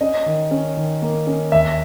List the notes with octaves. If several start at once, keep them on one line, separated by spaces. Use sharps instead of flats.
C#4 D#5
D#3
C#4
D#3
A#3
C#4
D#2 E5